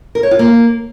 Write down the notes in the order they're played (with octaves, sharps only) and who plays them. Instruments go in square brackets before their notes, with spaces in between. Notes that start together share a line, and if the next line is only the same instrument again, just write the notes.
[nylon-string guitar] A#4
C#5
F4
A#3